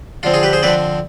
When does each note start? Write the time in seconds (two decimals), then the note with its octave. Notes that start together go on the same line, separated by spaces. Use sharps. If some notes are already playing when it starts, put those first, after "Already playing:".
0.23 D3 F3 C4 F4
0.33 F4 G#4
0.43 G4 B4
0.53 G#4 C5
0.63 D3 F3 C4 B4 D5